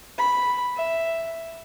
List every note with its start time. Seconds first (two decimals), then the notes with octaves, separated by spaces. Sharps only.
0.18 B5
0.76 E5